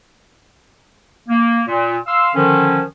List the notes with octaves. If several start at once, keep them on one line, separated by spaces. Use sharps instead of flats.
A#3
A#2
F5 C6 E6
D3 D#3 F3 C#4